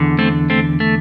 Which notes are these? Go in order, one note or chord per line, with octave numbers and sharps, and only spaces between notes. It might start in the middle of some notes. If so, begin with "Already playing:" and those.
Already playing: E2 D3
A3 C4
A3 C4
A3